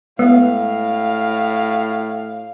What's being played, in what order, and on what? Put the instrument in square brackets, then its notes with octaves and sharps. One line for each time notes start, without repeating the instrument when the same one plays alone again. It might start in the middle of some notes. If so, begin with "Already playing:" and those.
[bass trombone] A2 [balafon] G#3 [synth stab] B3 [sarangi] F5